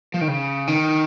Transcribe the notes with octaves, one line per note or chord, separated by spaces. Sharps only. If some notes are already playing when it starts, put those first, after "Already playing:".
F3
D#3
C#3
D#3